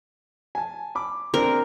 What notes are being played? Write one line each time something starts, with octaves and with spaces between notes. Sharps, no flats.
G#5 A5
B5 D6
C4 D4 A#4